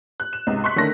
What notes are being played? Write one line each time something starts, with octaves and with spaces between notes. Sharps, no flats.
F#6
E7
C#2 G#2 C3
C6 C#6 F#6 B6
D3 D#3 A3 C#4 A#6